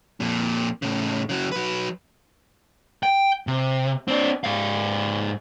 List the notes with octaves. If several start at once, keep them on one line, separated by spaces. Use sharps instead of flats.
F2 A#2
A2 C#3
C#3 F#3
F#3 B4
G5
C3
C4 D4
G#2 F5